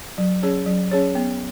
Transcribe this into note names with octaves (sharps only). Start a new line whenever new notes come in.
F#3
C#4 G#4 C#5
F#3
C#4 G#4 C#5
B3